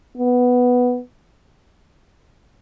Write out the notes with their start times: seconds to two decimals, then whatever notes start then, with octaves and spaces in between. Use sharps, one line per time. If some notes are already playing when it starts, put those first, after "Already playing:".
0.18 B3